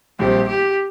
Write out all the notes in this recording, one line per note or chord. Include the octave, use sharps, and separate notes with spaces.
A#1 A#2 G3 C4 G4
G4